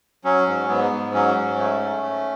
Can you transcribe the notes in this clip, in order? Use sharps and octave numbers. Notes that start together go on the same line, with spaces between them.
F#3 C#4
G#2
G#2 B3
G#2
F#3 C#4
G#2
A3
A3
A3